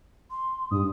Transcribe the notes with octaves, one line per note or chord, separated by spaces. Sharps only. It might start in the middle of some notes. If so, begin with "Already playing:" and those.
C6
G2 D#6